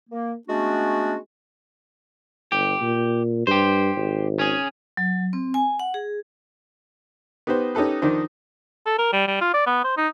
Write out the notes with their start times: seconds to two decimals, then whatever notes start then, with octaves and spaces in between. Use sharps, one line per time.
0.10 A#3
0.48 G#3 A3 B3 C#4 D4 F#4
2.52 G1 G4
2.81 A#2
3.47 G2 G4 C5
3.97 G#1
4.39 C#4 G#4
4.97 F#3
5.33 C4
5.54 G#5
5.80 F#5
5.94 G#4
7.47 B3 D#4 G4 B4 C5
7.75 C#4 D#4 G4 A4 B4
8.02 F2 D#3 D4 D#4 C5
8.86 A4
8.98 A#4
9.13 G3
9.28 G3
9.41 F4
9.54 D5
9.67 B3
9.85 C5
9.97 D#4